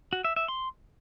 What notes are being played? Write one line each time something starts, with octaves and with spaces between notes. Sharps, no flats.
F#4
E5
E5
C6